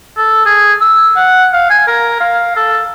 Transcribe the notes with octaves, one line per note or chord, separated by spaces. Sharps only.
A4
G#4
E6
F#5
F5
G#5
A#4
F5
A4